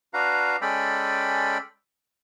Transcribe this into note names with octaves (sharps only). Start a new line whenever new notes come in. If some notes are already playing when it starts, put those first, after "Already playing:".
D4 F#4 B4 F5 A#5
G#3 C#4 A4 D5 G5 B5